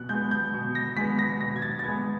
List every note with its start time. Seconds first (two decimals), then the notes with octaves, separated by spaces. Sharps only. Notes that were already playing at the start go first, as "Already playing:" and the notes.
Already playing: B2 F#6
0.09 G#3 B3 G6
0.31 G6
0.54 B2
0.75 A#6
0.97 G#3 B3 B6
1.19 A#6
1.40 B2 A#6
1.56 G#6
1.62 A6
1.79 A6
1.84 G#3 B3 G#6